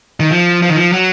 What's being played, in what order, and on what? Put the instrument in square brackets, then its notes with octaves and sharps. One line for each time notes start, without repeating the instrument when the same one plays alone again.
[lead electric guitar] D#3
F3
F3
D#3
F3
F#3